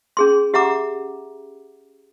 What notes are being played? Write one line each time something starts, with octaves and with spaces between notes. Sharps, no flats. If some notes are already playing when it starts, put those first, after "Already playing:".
C#4 G#4 C6
G4 E5 F#5 A#5 D6